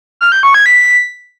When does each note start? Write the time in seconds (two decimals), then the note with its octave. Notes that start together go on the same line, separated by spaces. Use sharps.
0.21 F6
0.32 G6
0.43 C#6
0.54 G#6
0.66 B6